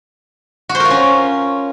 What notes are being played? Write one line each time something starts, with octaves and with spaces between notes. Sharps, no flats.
F#4
C5
A#4
F4
C#4